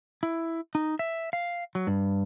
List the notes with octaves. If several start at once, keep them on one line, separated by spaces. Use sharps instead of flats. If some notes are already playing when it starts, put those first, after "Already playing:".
E4
D#4
E5
F5
F#3
G2